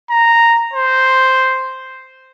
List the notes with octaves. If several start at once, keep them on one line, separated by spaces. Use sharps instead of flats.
A#5
C5